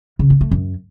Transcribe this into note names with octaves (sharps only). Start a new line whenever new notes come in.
C#3
A#3
A3
F#2